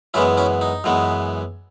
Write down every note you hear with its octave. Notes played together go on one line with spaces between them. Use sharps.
F#2 E3 G#3 B3 C#4 E4
C#4 E4
D#4
F#2 E3 G#3 B3